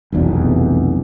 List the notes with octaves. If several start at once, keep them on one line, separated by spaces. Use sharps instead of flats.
F1 B1 E2 B2